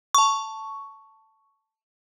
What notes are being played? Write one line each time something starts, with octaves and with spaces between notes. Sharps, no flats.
A5 C#6